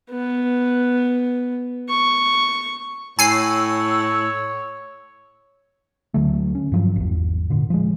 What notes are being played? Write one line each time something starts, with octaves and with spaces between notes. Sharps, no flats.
B3
C#6
A2 C#5 G#5 E6 C7
D2 D3 F#3 A3
C#4
G2 F3 F#3
G#1 E2
A#2 D3
F3 G#3